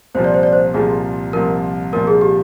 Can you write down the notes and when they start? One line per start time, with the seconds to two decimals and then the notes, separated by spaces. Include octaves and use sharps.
0.15 C2 A#2 F3 C5
0.24 D5
0.34 C5
0.43 D5
0.53 C5
0.74 C2 A#2 F3 G#4
1.33 C2 A#2 F3 A#4
1.93 C2 A#2 F3 A#4
2.07 G#4
2.21 G4